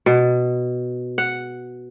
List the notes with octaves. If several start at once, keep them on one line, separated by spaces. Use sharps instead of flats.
B2
F#5